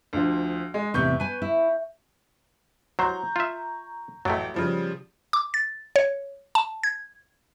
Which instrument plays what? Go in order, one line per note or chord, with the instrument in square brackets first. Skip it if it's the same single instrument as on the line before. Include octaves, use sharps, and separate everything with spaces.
[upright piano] D2 F3
G#3
[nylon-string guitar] E2 A2 C3 [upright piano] C#6 G6
[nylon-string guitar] B4 G#5
E4
[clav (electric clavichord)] F#3 C5 [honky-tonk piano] A#5 C#6 G6
[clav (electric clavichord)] F4 E5
[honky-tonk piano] A1 G5 [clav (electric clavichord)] F#3 A3
[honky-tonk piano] C#3 F3 G3
[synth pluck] D6
A6
C#5
A5
G#6